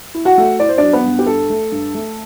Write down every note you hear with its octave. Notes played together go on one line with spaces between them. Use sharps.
E4
F#4 F#5
A3
E4 D5
C5
F#3 D4 D5
B3 B4
G2
G4
G2 A4
A3
G2
A3